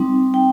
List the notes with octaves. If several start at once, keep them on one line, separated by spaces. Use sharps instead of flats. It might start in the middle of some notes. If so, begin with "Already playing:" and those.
Already playing: G3 C4 D#4
G5